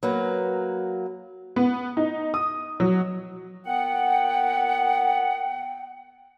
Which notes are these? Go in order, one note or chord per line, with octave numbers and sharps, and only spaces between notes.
F#3 A#3 B4
B3
D#4
D#6
F#3
A#2 B3 F#5 G5